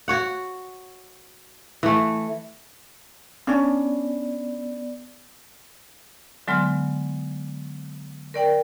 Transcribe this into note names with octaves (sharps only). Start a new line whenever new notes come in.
F#4 C#5 F#5
E3 A3
B3 C#4 D4 D5
D3 F#3 G#3 B3 C6 F6
A#4 D5 G5